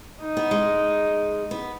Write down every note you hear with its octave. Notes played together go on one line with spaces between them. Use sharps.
D#4
B3
G#3
B3